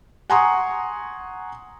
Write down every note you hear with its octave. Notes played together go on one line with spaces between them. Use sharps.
F#5 G#5 A#5 C6 C#6 D#6